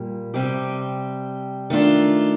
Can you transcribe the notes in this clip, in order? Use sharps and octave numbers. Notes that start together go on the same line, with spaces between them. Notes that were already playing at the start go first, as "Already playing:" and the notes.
Already playing: A#2 G3 A#3
C3 G3 C4 G4
D#3 A3 D4 F4